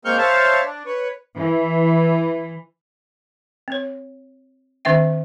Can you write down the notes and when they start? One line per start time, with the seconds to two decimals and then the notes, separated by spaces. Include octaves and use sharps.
0.05 G#3 A#3 C4 C#6 F6 G6
0.18 C5 C#5 E5 F5 A5
0.63 D4
0.86 B4 C#5
1.37 E3
3.68 C4 C#5
4.85 D#3 C4 D4 E5 G5